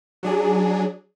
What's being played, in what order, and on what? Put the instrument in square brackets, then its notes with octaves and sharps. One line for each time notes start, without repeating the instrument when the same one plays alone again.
[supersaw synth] F#3 D4 G#4